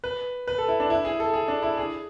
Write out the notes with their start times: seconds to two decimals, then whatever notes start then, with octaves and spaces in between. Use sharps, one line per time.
0.04 B4
0.48 B4
0.58 A4
0.68 E4
0.80 D4
0.90 E4
1.05 G#4
1.20 A4
1.34 G#4
1.48 D4
1.63 E4
1.77 G#4